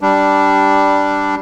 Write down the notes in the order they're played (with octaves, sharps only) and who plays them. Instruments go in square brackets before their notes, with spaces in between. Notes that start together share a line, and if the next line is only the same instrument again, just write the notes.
[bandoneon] G3 D4